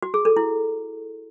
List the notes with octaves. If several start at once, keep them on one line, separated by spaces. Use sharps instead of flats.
F#4
G#4
A4
E4